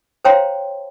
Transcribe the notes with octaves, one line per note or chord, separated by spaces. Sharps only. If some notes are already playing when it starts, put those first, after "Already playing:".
C5 C#5 F5 G5 A#5 C6